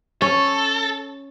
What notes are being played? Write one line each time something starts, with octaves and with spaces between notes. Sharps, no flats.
C#4 A4